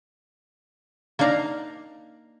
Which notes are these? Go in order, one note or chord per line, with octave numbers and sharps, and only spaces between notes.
A#3 D4 D#4 F5 A#5